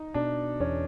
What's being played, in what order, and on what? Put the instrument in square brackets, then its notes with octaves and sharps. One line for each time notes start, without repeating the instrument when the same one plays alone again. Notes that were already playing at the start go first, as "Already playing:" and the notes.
Already playing: [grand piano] D#4
[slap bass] B2 [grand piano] D4
[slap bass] E2 [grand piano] C#4